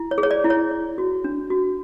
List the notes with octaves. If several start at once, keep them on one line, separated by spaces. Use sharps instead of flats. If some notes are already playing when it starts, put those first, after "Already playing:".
Already playing: E4
C#5
G#4
C#5
D5
E4
C#5
C#5
F#4
D4
F#4